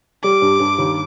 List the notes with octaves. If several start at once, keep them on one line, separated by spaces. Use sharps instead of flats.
G3 D6
G2
G2
D#2